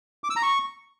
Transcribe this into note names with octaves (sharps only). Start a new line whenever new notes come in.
D6
E6
A#5
C#6